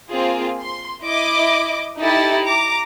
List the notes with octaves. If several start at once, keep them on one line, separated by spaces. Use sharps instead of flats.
A#3 C4 F4 G#4
C6
E4 D#5 D6
D#4 E4 G4 A4 A6
A#5 D6